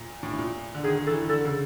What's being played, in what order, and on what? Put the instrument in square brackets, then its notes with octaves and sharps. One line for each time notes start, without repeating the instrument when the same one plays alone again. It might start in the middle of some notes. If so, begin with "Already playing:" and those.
Already playing: [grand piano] A#2
A2
A2
A#2
D3
[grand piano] D#3 [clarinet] G#4
[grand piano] D#3
[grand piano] E3 [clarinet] A4
[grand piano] D3 [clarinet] A4
[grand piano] C#3